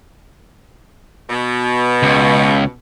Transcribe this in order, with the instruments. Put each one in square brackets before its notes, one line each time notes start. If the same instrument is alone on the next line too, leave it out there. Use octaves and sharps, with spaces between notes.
[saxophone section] B2
[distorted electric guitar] C#2